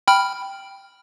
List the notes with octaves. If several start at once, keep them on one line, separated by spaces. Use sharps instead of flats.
G5 B5 F6